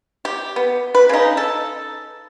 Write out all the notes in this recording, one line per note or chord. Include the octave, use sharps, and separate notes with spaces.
G4
B3
B4
C#3 D#4
A4